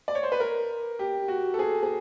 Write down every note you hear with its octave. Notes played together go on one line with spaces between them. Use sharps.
D5
C#5
C5
B4
A#4
G4
F#4
A4
G#4
G#4